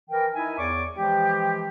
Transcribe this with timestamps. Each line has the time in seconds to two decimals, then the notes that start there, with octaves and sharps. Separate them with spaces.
0.10 E3 A#4 G5
0.34 D#4 E4 E5 G#5
0.58 E2 C#5 D5 C#6 D6
0.94 E3 F3 G#3 G4